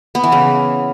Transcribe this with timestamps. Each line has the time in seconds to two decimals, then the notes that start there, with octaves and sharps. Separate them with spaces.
0.15 B3
0.24 E3
0.32 C#3